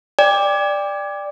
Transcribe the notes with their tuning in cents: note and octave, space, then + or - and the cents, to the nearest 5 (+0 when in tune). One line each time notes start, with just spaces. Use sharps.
D5 +0 G5 +30